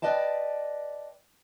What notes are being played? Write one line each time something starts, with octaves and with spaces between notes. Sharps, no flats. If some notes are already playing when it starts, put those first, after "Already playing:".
B4 D5 D#5 G5 A5